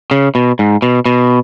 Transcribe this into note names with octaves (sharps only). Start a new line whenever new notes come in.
C#3
B2
G#2
B2
B2